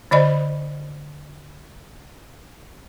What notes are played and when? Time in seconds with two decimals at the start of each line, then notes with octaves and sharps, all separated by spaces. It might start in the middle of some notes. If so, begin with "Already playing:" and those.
0.11 D3 C5 D5 D#5 B5